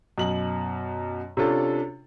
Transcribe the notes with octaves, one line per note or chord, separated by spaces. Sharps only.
F#2 B2 F#7
C3 C#4 D4 F4 A4